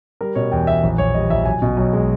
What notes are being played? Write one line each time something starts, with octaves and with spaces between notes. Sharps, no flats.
G3 A#4
B2 C#5
E2 G5
E2 E5
A#1
A#1 C#5
G3 D#5
A#1 E5
B1 G#5
B2
B1
G#3